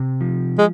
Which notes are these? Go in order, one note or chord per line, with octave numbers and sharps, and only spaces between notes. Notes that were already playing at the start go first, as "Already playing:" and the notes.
Already playing: C3
F3
G#3